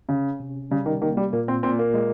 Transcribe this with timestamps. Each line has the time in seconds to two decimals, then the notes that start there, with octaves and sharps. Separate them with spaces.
0.09 C#3 C#4
0.40 C3
0.71 C#3 G3
0.86 D#3
1.02 D#3 A#3
1.17 G3
1.33 A#2 A#3
1.48 C4
1.63 A#2 C4
1.79 A#3
1.94 G#3